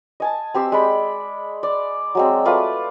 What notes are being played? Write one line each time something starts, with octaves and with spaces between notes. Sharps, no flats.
D#5 G#5 A5
C4 G4 C6 E6
G#3 D5 B5
D5
F#3 G#3 C4
A3 F4 B4 D5